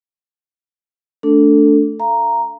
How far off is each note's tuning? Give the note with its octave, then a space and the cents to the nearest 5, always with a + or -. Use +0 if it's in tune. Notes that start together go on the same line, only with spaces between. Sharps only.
A3 +0 D4 -15 A4 +15
F5 -30 A#5 +0